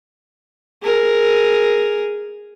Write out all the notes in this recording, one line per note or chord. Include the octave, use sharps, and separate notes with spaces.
G#4 A#4